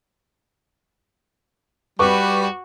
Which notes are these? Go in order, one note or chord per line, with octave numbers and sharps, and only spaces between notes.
G3 F#4 B4 C#6 D6